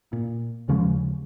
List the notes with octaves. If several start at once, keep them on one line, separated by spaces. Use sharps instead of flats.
A#2
D#2 C#3 F3 G#3